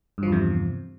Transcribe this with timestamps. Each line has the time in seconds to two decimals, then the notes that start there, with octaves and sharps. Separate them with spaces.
0.18 G2
0.23 F3
0.28 E2
0.32 C3